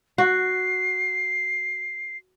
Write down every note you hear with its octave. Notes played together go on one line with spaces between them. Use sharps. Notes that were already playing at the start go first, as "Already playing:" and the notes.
F#4 C7